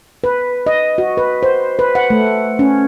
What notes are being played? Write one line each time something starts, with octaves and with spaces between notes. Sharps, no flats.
B4
D#5
F#4
B4
C5
B4
F#5
A3
C#4